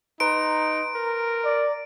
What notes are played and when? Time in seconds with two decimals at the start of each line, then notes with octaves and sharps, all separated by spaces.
0.20 D#4 B4 A#5 C6 D7
0.95 A#4
1.44 D5